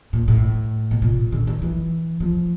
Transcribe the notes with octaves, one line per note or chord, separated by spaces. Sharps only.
A#2
A2
B2
A#2
D3
D#3
E3
F3